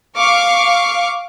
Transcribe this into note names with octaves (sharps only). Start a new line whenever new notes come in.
F5 C#6 D6 F6